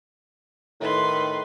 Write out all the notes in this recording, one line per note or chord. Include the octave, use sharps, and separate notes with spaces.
A2 D#3 B4 C6